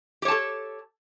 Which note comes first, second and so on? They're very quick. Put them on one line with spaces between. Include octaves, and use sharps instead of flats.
G4 C#5 A5 A4